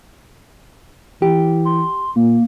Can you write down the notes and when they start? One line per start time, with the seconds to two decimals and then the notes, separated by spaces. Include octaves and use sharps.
1.22 E3 G4
1.65 C6
2.16 A#2 A#3